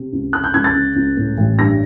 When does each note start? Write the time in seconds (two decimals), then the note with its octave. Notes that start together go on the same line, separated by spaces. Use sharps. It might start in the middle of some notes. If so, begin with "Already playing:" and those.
Already playing: C3
0.13 C#2
0.33 C3 F#6
0.44 G6
0.54 C#2 G#6
0.64 A6
0.75 C#3
0.96 C#2
1.17 A2
1.37 A1
1.58 G2 A#6